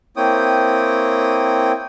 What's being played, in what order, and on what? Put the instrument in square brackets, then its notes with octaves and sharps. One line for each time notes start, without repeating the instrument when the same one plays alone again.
[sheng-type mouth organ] A#3 C4 E4 C#5 G5 D#6